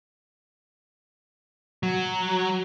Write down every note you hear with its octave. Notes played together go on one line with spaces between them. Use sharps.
F#3